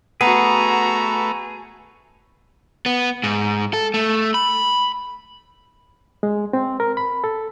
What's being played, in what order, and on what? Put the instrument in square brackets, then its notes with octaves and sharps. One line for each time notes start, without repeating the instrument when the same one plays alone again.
[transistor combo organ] A3 B4 [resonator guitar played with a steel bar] B3 [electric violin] F#4 A#5 [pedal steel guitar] G#4
[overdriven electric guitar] B3
G#2
A4
A3
B5
[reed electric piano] G#3
C4
A#4
B5
A4